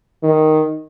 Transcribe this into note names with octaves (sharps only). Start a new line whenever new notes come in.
D#3